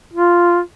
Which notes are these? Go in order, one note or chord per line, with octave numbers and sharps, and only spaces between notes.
F4